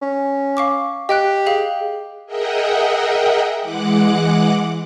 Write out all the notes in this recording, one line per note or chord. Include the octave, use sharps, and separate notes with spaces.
C#4
F5 C#6 D6
G4 D#5 G5 F#6
G#4 F5
G#4 A#4 D#5 E5 F#5 G5
E3 G#3 F#5 D6 F#6